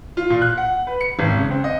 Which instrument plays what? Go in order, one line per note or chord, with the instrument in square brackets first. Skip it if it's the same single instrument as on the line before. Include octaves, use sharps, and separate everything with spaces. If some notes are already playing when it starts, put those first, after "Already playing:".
[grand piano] F4
A#2
F#6
F#5
B4
C#7
G#1
C#3
C4
D#5